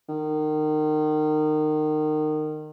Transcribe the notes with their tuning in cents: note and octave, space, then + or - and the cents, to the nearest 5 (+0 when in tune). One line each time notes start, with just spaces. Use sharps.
D#3 -25